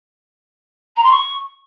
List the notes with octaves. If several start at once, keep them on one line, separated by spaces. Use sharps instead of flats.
A#5
C6
C#6